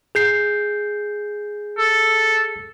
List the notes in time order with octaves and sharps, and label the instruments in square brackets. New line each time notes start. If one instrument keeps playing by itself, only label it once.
[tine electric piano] G#4 G6 C7
[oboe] A4